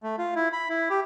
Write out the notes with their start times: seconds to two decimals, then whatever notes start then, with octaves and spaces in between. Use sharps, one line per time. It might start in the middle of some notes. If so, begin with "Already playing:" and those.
0.03 A3
0.18 F4
0.35 E4
0.53 B5
0.70 E4
0.90 G4